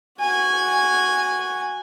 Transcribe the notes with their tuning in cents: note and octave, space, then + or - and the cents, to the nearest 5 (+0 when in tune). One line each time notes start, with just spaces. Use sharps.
F#4 +0 G#5 -10